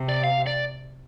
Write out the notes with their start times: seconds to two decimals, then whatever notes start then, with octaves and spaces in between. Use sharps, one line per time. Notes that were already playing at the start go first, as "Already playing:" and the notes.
Already playing: C3
0.09 D5
0.24 F5
0.47 D5